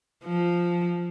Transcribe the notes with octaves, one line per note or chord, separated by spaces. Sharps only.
F3